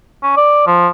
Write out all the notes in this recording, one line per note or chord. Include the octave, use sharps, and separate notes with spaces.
C#4
D5
F3